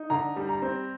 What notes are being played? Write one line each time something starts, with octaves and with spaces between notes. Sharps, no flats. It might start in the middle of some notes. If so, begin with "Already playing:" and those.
Already playing: D#4
D3 A#5
G3
A#5
C4